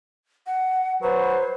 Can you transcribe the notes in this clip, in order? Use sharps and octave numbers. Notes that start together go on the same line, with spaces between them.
F#5
F#3 B4 C5